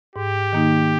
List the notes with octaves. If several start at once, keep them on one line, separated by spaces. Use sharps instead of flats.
G#2 G4
D#3 A#3 D#4